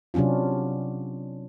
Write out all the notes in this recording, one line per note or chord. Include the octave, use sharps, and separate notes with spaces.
C3 F#3 C#4 D4 F4